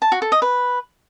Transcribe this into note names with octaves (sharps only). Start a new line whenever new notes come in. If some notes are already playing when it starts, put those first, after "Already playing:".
A5
F#4
A4
D#5
B4